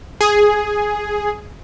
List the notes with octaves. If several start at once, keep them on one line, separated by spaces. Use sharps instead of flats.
G#4